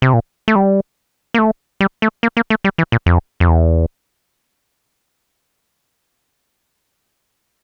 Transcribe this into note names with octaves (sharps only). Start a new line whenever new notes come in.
C3
A#2
A3
G3
A#3
A3
G3
A3
A#3
A#3
A3
G3
E3
A#2
F2
F2
E2